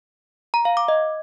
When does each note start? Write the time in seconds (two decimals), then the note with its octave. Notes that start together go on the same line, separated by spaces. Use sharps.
0.54 A#5
0.65 F5
0.77 D6
0.88 D#5